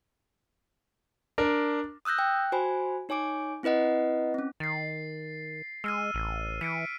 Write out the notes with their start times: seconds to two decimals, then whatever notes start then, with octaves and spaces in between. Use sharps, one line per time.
1.38 D4 A#4
2.05 D#6 E6 F#6 G6 A#6
2.19 G5 F#6
2.52 F#4 C5 G#5 B5
3.09 D#4 C#5 G#5 D6 D7
3.63 C4 E4 B4 D#5 F#5
4.34 C4 C#4
4.60 D#3 A6 C7
5.84 G#3 E6 F6 D#7
6.14 A1
6.61 E3 B6 C#7 D7